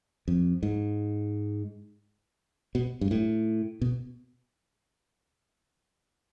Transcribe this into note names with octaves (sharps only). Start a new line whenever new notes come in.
F2
G#2
B2
G2
A2
B2